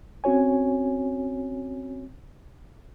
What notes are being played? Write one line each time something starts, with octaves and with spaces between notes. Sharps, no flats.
C4 C#4 F#4 C#5 G#5